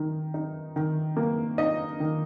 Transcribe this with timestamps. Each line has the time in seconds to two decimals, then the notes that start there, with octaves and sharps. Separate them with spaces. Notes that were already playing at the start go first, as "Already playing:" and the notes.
Already playing: D#3
0.34 D#4
0.76 D#3
1.17 A#3
1.58 D#4 D#5
2.00 D#3